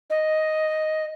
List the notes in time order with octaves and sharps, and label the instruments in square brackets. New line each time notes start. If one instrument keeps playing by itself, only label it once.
[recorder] D#5